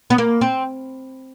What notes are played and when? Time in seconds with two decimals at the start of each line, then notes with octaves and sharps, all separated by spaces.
0.10 B3
0.18 A#3
0.41 C4